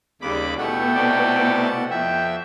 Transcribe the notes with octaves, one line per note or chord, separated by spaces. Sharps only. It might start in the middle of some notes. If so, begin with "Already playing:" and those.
D#2 C#3 G3 B5 D6
B2 A3 B3 E4 F#5 G5
C3 A3 D5
F2 E5 G5